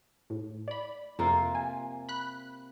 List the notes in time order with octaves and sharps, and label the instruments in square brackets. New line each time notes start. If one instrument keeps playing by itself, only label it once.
[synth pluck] A2
D5 B5
[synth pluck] F2 [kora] C3 A#3 F4
[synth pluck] G#5
B5 F#6